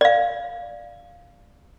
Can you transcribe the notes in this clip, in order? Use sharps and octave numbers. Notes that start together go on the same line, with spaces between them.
D5 F5